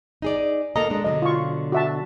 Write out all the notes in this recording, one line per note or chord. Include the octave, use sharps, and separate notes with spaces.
D#4 G#4 D5
A#3 A4 D#5 A#5
G#3 D4
B2 D3 F#3 D#5
F4 C#6
F#4 E5 A5